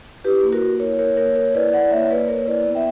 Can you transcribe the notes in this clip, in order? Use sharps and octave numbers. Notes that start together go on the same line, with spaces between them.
E4 G4 B4
A#3
F#4 A#4
A#3
E4 A#4 C#5
A#3 A#4 C#5
A#3 A#4 C#5
A#3 A#4 C#5
E4 B4 D5
E4 D5 F#5
A#3 C#5 E5
A#3 B4 D5
A#3 A#4 C#5
E4 B4 D5
B3
E5 G5